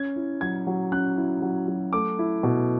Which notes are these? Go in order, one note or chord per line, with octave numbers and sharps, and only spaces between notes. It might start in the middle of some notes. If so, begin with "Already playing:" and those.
Already playing: C#4 G#6
E4
F#3 G#6
F#3
C#4 F#6
E4
F#3
F#3
A3 D6
E4
B2